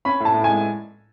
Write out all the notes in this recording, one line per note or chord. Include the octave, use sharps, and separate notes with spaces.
C#4 B5
A2
A5
A2
G#5
G#3